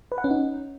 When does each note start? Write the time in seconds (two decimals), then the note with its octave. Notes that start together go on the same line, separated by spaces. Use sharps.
0.12 B4
0.18 F#5
0.24 C#4
0.31 D#4